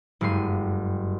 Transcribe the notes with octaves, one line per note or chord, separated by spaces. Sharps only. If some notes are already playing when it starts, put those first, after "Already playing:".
F#1 G2 G3 G#3 C7 D#7